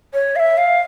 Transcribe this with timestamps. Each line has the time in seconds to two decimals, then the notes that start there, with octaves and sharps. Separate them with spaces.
0.13 C#5
0.36 F5
0.39 E5
0.57 F5